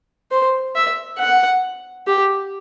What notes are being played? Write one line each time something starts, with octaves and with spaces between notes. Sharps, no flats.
C5
E5
F#5
G4